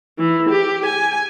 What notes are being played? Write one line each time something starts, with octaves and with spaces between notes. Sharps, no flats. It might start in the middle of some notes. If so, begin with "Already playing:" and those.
E3
G4
G#5